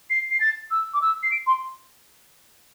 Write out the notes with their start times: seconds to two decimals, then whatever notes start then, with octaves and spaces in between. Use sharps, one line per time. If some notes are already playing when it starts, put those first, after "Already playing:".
0.10 C7
0.31 C7
0.40 A6
0.71 E6
0.94 D6
1.02 E6
1.23 C7
1.31 D7
1.47 C6